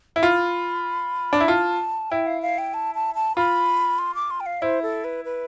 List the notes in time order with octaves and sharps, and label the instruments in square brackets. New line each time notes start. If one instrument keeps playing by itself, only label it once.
[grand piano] E4
[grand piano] F4 [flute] B5
[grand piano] D4
E4
[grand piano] F4 [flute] A5
[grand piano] E4 [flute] G5
[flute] F5
F5
G5
A5
A5
A5
[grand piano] F4 [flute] B5
[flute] C6
D6
C6
G5
F5
[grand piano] E4 [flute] C5
[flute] A4
B4
B4